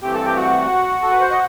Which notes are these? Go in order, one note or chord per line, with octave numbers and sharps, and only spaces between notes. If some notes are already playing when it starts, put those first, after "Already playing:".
G2 E3 A3 C4 G4 G5
A4 A5
G4 G5
F#4 F#5
A4
B4
C5
D#5